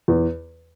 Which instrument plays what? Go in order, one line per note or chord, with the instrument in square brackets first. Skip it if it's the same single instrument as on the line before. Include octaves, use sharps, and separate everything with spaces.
[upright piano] E2